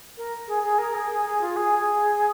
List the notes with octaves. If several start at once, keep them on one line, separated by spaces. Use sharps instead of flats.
A#4
G#4
G#4
A#4
G#4
G#4
G#4
F4
G#4
G#4